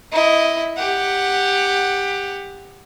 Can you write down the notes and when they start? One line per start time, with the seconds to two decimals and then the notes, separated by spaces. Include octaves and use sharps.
0.12 E4 D#5
0.77 G4 F#5